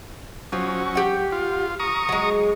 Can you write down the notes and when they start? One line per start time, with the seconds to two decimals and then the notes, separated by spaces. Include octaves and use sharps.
0.52 F3 F#3 C#4
0.95 G4 F#5
1.32 F4
1.80 A#5 C#6 D#6
2.09 F#3 G#3